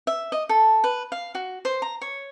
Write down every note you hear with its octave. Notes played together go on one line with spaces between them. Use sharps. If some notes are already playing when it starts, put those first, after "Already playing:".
E5
D#5
A4
B4
F5
F#4
C5
A#5
C#5